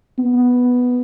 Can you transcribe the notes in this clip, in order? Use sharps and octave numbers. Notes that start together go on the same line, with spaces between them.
B3